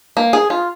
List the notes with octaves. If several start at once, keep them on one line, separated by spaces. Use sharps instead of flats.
A#3
G#4
F4